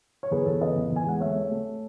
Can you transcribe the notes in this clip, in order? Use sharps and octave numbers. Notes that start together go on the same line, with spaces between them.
C#5
E2 G#4 B4
E2 A4 C#5
C#3 B4 D#5
E2
E2
G#5
G#3 F#5
A3 C#5 E5
A3
A3